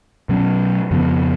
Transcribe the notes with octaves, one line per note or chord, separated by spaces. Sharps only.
B2 F#3 C#4
F2 C#3 F3 B3